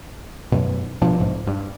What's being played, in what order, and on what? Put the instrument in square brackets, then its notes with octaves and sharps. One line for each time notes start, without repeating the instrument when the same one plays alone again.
[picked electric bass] F#2 B2
B2 F3 D4
B1 G#2
G2